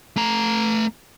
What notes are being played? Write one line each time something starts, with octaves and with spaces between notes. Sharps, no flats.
A3 A#5